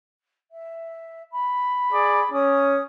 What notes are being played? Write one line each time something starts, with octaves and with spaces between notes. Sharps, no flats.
E5
B5
G#4 D5
C#4 D#6